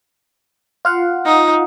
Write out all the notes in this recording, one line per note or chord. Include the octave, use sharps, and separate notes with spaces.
F4 F5 F#5
D#4